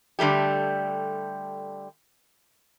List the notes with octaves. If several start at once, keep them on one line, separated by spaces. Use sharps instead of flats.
D3 G3 A3 G4